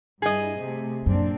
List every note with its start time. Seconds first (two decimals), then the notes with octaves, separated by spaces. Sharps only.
0.22 G2 E4 G#4 D#5
0.59 C3 A3
1.06 F#2 A#2 C4 D4